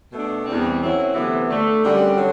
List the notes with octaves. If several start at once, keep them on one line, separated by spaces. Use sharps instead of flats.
B2 A3 D4
E2 B2 G3 C4
F#2 F#3 C4 E4
D2 C3 E3 B3
D2 D3 A3
F#2 D3 G3 C4
D3 F#3